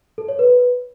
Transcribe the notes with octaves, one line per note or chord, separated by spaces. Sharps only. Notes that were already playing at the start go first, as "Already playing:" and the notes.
A4
C#5
B4